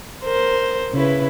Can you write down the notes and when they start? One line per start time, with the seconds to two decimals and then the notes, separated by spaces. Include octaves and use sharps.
0.24 A#4 C5
0.93 C#3 E4 B4